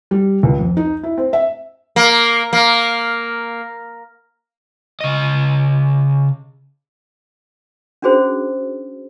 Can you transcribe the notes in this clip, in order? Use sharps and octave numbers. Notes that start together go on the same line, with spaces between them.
G3
C#2
F2
D#4
E4
C4
E5
A#3
A#3
C#3 D#5
C#4 D4 F#4 G#4 C5